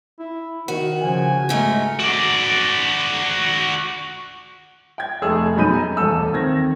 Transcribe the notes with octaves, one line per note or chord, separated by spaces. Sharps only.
E4
D#3 F#4
C#3 F3 G#5
G#2 G#3 A3 A#4
F#4 D5
G5 G#6
F1 A3 G#4 E6
F#2 B2 D#4 B5 G6 D#7
G#5 A#5
D#1 E2 A3 A4 E6
D#3 C4 G#6 A#6